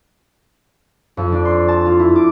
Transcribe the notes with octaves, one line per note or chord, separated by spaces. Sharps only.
F2
D4
C6
A5
F4
E4
D6